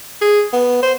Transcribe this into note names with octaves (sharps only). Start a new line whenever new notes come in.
G#4
B3
C5